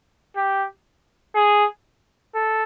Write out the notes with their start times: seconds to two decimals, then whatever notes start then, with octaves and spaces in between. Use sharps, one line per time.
0.37 G4
1.36 G#4
2.35 A4